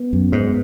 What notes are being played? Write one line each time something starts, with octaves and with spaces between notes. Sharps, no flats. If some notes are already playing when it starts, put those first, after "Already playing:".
Already playing: B3
F#2
G#2